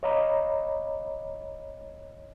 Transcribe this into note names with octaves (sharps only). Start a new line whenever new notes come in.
C#5 D#5 F5 A#5 B5 D6